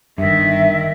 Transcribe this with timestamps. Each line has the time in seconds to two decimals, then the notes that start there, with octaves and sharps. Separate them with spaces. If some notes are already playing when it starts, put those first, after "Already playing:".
0.18 G1 G2 D#3 E5